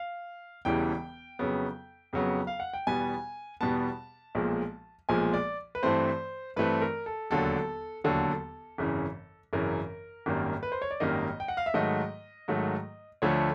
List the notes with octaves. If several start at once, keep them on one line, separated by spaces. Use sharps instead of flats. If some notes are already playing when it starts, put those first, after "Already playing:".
Already playing: F5
E1 E2 C#3 E3 G3 G5
F2 C#3 F#3 B3
F2 C#3 F#3 B3
F5
F#5
G5
E2 B2 G3 B3 G#5
E2 B2 G3 B3 A5
B1 A#2 F3 G#3
B1 A#2 F3 G#3 G#5
D5
B4
G2 E3 A3 C4 C5
G2 E3 A3 C4 B4
A#4
A4
E1 D#2 D3 F#3 A4
E1 D#2 D3 F#3 A4
G#1 F#2 C#3 E3
G#1 F#2 C#3 E3 A#4
G#1 F#2 D#3 G3 A#3
B4
C5
C#5
D5
G#1 F#2 D#3 G3 A#3 D#5
G5
F#5
F5
E5
G#2 D#3 F#3 A3 D#5
G#2 D#3 F#3 A3
D2 D3 F3 A3 C#5